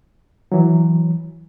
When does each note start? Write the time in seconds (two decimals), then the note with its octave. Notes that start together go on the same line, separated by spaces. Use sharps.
0.52 E3 F#3